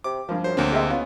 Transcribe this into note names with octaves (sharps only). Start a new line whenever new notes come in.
C3 D6
G2 F3 A#3
F#2 C5
D2 D3 A#3 C4
G#3 G4 E5
B3 C#4 F4